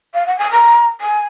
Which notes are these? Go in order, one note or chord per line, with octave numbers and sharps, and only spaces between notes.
F5
F#5
G#5
A#5
G#5